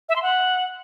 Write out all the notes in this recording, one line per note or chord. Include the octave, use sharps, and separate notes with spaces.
E5
C6
F#5